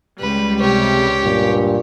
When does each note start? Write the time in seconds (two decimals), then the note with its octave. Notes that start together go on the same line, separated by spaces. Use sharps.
0.20 C#2 G3 B4
0.60 C3 G4 C#5
1.24 G2 A#2